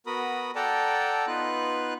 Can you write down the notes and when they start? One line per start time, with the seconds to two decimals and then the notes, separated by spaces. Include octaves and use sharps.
0.06 B3 F#4 A#4 B5 D#6
0.55 A4 D5 F#5 G5 A5 A#5
1.27 B3 D#4 F4 B4 F#6